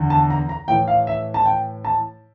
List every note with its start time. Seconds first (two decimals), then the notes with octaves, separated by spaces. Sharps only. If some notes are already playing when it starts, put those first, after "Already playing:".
Already playing: E2 D3
0.10 A5
0.30 A#5
0.49 A#5
0.68 A2 E3 G5
0.88 F5
1.07 E5
1.34 A5
1.45 G5
1.85 A5